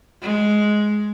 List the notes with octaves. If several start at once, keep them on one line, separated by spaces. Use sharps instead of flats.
G#3